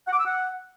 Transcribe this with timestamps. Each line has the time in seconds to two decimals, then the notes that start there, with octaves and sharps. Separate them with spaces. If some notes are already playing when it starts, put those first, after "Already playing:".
0.07 F#5
0.13 D6
0.19 E6
0.25 F#5